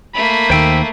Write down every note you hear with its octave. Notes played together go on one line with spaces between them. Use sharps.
A3 A#3 B5 B6
D#2 D#3 C5 G5 E6